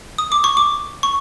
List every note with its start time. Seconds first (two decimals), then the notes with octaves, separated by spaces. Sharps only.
0.18 D#6
0.32 D6
0.44 C#6
0.57 D6
1.03 C#6